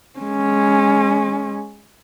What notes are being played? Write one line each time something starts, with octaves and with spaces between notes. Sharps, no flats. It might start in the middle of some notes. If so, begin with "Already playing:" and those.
G#3 C#4